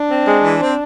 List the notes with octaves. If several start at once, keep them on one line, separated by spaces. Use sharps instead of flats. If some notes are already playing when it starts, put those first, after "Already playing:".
Already playing: D4
C4
G#3
E3
C4